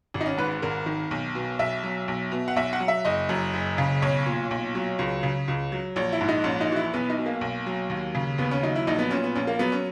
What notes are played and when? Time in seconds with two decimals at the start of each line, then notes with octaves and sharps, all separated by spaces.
0.14 G#1
0.21 D#4
0.26 C#4
0.38 G#2 B4
0.62 G#1 A#4
0.86 D#3
1.11 B1
1.35 B2
1.59 B1 E5
1.83 F#3
2.08 B1
2.32 B2
2.48 F#5
2.56 B1 E5
2.73 F#5
2.80 F#3
2.88 E5
3.05 F#1 D#5
3.29 F#2
3.53 F#1
3.78 C#3
4.02 B1 C#5
4.26 A#2
4.51 B1
4.75 F#3
4.99 C#2
5.23 C#3
5.48 C#2
5.72 F#3
5.96 A#1 C#5
6.13 E4
6.21 G#2
6.28 D#4
6.44 A#1 C#4
6.61 D#4
6.69 E3 F#4
6.76 E4
6.94 B1 B3
7.10 D#4
7.18 B2
7.26 A#3
7.41 B1
7.66 F#3
7.90 D#2
8.15 C#3
8.38 D#2 B3
8.51 C#4
8.63 F#3 D#4
8.76 E4
8.87 A#1 D#4
8.99 B3
9.11 A#2 C#4
9.24 B3
9.35 A#1 C#4
9.47 A#3
9.59 F#3 B3
9.72 C#4